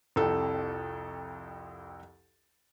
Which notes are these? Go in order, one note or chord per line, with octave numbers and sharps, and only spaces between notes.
C2 F2 A4 G5